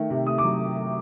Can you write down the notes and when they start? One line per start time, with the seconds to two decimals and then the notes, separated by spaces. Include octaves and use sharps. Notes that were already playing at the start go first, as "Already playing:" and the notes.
Already playing: D#3 A3
0.10 C3
0.26 A3 D#6
0.38 D6
0.44 F#3